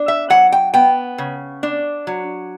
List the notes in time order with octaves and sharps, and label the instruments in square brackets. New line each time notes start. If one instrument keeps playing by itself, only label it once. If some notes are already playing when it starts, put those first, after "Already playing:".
Already playing: [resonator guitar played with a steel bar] D4
E5
F#3 F#5
G5
B3 G5
C#3
D4
F#3